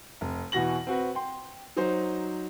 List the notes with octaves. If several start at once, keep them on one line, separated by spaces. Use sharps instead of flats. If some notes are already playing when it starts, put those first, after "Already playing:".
F1
E2 B2 E3 F#4 A#6 F#7
C4 F#4 B4
G5 C6
F#3 D#4 C5